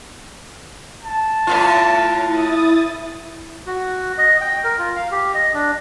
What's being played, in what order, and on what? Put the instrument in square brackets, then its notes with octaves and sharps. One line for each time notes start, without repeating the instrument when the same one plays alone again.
[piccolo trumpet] A5
[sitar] A2 B3 F4
[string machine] E4 D#6 A6
[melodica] F#4
D#5
G5
A#4
F4
F5
G4
D#5
D4